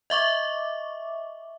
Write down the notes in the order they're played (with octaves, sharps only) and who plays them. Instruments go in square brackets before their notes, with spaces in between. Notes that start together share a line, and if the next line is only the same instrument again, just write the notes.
[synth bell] D#5 E5 C#6 D6